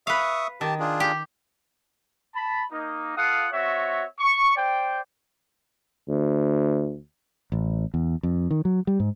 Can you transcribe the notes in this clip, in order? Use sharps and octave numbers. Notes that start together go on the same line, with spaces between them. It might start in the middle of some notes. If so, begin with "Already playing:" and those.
B4 E5 F5 C#6 D#6
D#3 G4 A5
D4 F4 G#4
G4
A5 B5
A#3 D#4
F4 A4 F5 F#5 D#6
C4 F#4 C#5 E5
C#6
C5 D5 G5
D2
A1
E2
F2
D#3
F#3
G3
G#2